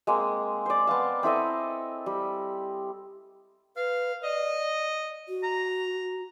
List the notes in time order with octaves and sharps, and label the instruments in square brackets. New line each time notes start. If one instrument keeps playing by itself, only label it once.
[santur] G#3 A#3 C4
C5 D5
B3 C4 F5 A5
C4 E4 A4 D#5
G3
[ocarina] B4 [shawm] F5
[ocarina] D5 [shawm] D#5
[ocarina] F#4
[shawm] A#5